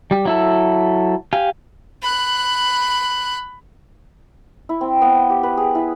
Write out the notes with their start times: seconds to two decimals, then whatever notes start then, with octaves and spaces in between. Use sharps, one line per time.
0.11 G3 G4
0.25 F#3 E4 A4
1.33 G4 F5 G#5
2.02 B5 F#6
4.69 E4
4.81 C4
5.02 B3
5.15 G5
5.30 G4
5.43 B4
5.57 G#4
5.75 E4